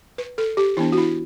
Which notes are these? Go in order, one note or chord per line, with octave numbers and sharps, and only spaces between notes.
B4
A4
G4
E3 B3 D4 E4
F#4
E4